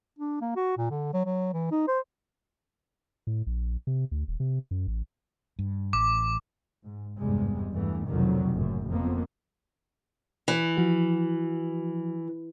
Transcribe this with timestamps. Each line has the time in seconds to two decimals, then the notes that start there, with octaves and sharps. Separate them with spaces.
0.19 D4
0.41 A#3
0.56 F#4
0.77 A#2
0.90 D3
1.14 F#3
1.25 F#3
1.53 E3
1.71 D#4
1.88 C5
3.27 A2
3.47 A#1
3.87 C3
4.11 D2
4.28 D#1
4.40 C3
4.71 F#2
4.87 A1
5.59 G2
5.93 A1 D6
6.86 G#2
7.17 G#1 E2 G2 C3 G3 G#3
7.73 E2 G2 E3 A3
8.08 F1 B1 F2 D3 D#3 F#3
8.52 F#1 F#2 A2
8.91 F2 A#3 B3
10.48 E3
10.77 F3 F#4